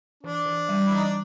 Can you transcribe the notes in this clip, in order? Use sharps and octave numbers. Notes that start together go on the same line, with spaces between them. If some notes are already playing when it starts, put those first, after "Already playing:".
E3 D4
E3
G3
E4
E3 D#4
D4